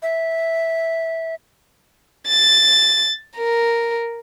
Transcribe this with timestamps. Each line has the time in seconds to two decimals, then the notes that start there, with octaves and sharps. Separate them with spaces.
0.02 E5
2.28 A6
3.37 A#4